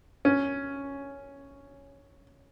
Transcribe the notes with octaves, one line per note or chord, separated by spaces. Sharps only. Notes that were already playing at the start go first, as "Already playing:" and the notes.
C#4